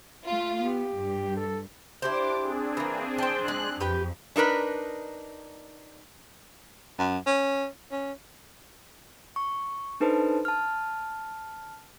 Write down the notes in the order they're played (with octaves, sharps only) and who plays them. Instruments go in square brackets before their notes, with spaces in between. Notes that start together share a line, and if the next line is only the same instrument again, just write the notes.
[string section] A3 F4
[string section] B3 [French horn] G4
[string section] G2
[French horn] A4
[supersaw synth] D4 D6 [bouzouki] E4 G4 C5
[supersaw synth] C4 D4 G#4
[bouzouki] E3 A#3
[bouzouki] C5 A5 [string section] G5
[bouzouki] G#3 [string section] F#6
[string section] F2 [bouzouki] G4 B4 G5
[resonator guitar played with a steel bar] D4 D#4 A#4 B4
[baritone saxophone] F#2
C#4
C#4
[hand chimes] C#6
D4 D#4 A4 B4 C5 A5
A5 F6